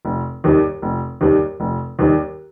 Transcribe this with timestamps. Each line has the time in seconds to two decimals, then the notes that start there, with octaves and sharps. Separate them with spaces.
0.05 F1
0.44 D#2 D#3 G3
0.82 F1
1.21 D#2 D#3 G3
1.60 F1
1.99 D#2 D#3 G3